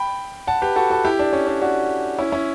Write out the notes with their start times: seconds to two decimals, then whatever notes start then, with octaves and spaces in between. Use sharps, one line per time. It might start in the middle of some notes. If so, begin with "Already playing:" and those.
Already playing: G5 B5
0.47 F#5 A5
0.62 G4 B4
0.76 F#4 A4
0.90 F#4 A4
1.05 E4 G4
1.19 D4
1.33 C#4
1.47 D4
1.62 D4 F#4
2.19 C#4 E4
2.32 C#4 E4